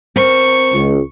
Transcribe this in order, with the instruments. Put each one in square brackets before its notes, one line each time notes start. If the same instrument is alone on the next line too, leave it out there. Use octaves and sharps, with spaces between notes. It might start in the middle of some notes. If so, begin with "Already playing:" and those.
[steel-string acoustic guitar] C4 A#4 [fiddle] C#6
[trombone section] C#2